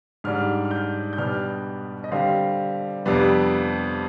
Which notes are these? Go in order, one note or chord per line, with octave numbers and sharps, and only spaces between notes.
G#2 G3 D4 F6
F6
G6
G6
B2 G3 B3 D4 F6
D#5
D3 G3 C4 F5
F2 C3 G3 B3 D4